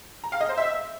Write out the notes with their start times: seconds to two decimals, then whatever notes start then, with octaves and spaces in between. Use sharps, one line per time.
0.24 A#5
0.32 F5
0.41 D#5
0.49 C5
0.57 E5